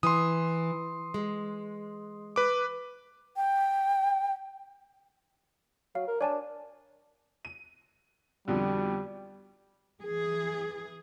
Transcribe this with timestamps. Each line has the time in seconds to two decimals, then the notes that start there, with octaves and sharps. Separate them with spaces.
0.03 E3 C6 D#6
1.14 G#3
2.36 B4 D6
3.37 G5
5.95 F#3 F5
6.07 A#4
6.21 D4 C#5 G#5 A5
7.45 D#7
8.48 F2 B2 D3 G3
10.03 E3 G#4